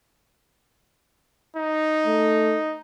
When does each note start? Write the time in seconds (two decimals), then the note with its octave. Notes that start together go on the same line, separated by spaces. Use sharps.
1.56 D#4
2.06 A3